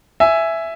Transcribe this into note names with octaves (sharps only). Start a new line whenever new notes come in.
E5 G#5